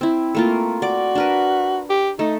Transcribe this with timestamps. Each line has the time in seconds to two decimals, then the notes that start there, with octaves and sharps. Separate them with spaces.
0.01 C4 E4
0.35 A3 A#3 F4
0.82 F#4 D5 D6
1.15 D4 A#4 B4
1.90 G4
2.19 A3 D#4